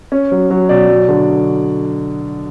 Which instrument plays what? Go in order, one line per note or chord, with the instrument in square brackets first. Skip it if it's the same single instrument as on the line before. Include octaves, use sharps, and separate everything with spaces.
[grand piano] C#4
F#3
F#3
B2 D5
F#3
D3